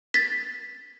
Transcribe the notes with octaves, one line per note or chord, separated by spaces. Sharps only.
A6 B6